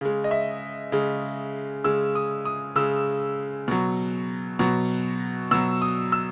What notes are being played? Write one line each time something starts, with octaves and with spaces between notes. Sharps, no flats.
C#3 G#3
D#5
E5
C#3 G#3
C#3 G#3 E6
D#6
D#6
C#3 G#3 E6
B2 F#3
B2 F#3
B2 F#3 E6
D#6
E6